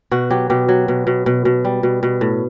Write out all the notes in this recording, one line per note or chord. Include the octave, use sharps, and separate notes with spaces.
B2 F#4
F#3 G4
B2 G4
F#3
B2
B2
B2
B2
G3
B2
B2
A2